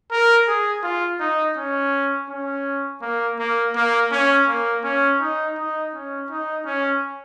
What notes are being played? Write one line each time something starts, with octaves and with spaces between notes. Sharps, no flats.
A#4
G#4
F4
D#4
C#4
C#4
A#3
A#3
A#3
C#4
A#3
C#4
D#4
D#4
C#4
D#4
C#4